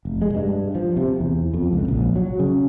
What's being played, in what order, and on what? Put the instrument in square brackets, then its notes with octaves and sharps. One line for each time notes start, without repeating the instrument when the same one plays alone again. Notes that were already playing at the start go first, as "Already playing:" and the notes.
[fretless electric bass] F1
G#3
G2
F3
C3
E2
F2
C#2
A#1
F#3
C#3